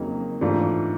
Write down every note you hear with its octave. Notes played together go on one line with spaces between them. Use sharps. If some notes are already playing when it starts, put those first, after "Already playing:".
Already playing: F2 C#3 F#3 A#3 D#4
G#2 E3 A3 D4 F4